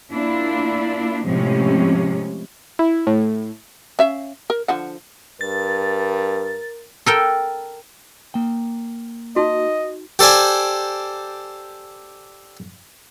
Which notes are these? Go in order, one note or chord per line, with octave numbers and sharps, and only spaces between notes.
A#3 D4 E4 F4
A2 C3 F3 G#3 C#4
E4
A2
C#4 E5 F5
A#4
D3 F3 F#5
G2 A#4 A6
A4 A#4 G5
A#3 G5
D#4 F#4 D#5
G4 A4 C5 D5 G#5